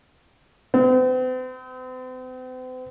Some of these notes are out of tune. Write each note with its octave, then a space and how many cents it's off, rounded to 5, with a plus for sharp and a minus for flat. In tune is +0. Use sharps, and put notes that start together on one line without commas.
C4 -45